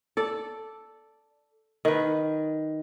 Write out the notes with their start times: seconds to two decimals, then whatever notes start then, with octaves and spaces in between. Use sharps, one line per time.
0.17 A4 D5
1.85 D#3 B4